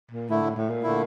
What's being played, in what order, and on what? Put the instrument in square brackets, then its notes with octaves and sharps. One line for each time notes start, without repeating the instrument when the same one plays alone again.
[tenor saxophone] A#2
[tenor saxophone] A2 [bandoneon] D3 A3 E4
[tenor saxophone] A2
A2
A#2
[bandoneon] D3 A3 E4